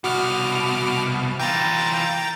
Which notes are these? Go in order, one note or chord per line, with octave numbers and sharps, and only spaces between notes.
C2 B2 F#4 D6 F6
E3 F4 G5 A#5 A6